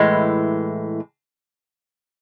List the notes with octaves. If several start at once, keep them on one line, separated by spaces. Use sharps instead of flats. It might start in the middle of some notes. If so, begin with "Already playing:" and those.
Already playing: A2 E3 G#3